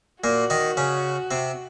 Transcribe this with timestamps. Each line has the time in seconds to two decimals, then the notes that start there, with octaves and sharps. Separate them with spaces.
0.23 A#2 A#3 F#4
0.50 D#3 D#4
0.77 C#3 C#4
1.31 C3 C4